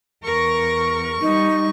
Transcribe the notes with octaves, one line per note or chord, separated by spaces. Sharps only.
E2 A#4 C#6
G3 D#4